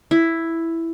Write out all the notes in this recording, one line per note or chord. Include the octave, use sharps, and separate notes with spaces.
E4